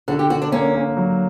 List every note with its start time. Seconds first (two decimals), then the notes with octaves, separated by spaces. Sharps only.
0.08 D3 F#4
0.19 G4
0.30 D3 F#4
0.42 D4
0.52 A#3 C#4
0.74 A#3
0.97 F#3